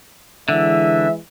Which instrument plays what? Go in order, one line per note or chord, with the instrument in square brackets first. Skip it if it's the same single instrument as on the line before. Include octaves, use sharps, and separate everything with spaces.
[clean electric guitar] D3 [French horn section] E3 G#3 [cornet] E5